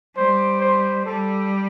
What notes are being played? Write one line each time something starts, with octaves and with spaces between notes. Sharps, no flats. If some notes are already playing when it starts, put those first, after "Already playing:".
G3 C5
C5
G3 A4